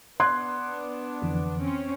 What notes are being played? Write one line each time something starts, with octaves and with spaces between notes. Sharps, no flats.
B3 D4 C6 F#6 G#6
F2 D3 E3
C4 C#4